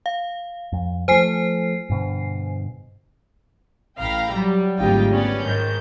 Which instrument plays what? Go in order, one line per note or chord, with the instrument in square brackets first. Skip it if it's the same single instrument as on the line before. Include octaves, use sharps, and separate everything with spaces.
[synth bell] F5
[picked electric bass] F2
[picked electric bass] F3 A3 [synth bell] C5 G#5 C7
[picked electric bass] G2 B2 D3
[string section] A1 F5 G5 A#5 B5
F#3 G3
G#1 D2 G3 D#4 F4 G5
B3 C#4 B4 D5
G#2 D#3 G6